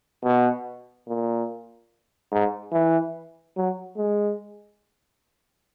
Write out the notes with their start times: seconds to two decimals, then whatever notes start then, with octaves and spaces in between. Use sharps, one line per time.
0.24 B2
1.08 A#2
2.32 G#2
2.73 E3
3.57 F#3
3.97 G#3